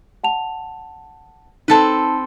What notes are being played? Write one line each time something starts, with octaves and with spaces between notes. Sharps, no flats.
F#5 A5 F7
C4 D#4 A4 B4 A5